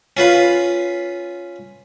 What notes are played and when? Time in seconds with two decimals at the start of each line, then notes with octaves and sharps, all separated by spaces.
0.17 C#4 F4 B4 F5